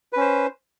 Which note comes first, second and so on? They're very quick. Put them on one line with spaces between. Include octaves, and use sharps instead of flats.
B4 C#4 C5